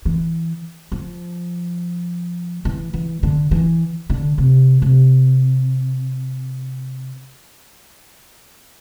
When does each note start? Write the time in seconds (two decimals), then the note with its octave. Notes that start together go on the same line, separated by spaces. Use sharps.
0.05 E3
0.92 F3
2.65 E3
2.94 E3
3.23 D3
3.51 E3
4.10 D3
4.38 C3
4.82 C3